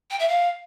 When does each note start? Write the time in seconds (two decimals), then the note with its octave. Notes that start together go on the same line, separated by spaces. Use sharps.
0.11 G5
0.19 E5
0.28 F5